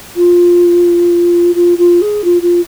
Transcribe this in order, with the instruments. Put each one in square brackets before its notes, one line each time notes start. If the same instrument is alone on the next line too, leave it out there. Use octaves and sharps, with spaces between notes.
[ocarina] F4
F4
F4
G#4
F4
F4